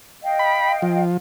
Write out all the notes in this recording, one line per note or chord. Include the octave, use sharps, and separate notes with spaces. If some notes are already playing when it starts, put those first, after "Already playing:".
D#5 F5 G5
B5
F3